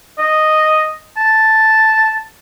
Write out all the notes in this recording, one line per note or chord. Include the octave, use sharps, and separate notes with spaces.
D#5
A5